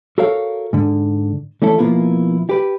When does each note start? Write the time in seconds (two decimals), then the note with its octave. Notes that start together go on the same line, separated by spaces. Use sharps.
0.18 F#4 A4 A#4 C#5 F5
0.73 G#2 D3
1.62 E3 A3 C#4 E4 A4
1.78 B2 F3 A#3 B3 E4 F4
2.49 G4 B4